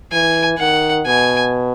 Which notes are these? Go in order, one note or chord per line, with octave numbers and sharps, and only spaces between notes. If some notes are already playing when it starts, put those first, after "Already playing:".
E3 G#5
D#3 F#5
B2 G#5